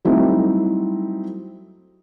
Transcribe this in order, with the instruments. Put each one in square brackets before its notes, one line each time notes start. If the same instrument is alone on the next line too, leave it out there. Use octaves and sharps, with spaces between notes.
[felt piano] F#3 G3 A3 C4 D#4 E4